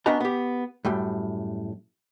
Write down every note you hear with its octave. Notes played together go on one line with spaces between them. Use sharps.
B3 C#4 D4 F#4 D#5 A#5
B3 G4
F#2 A2 G3